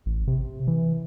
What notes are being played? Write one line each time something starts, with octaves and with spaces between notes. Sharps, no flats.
A1
C3
E3